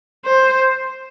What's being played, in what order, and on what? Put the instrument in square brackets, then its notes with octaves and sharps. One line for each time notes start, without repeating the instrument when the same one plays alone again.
[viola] C5